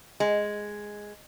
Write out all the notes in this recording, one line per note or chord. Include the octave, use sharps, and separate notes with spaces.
G#3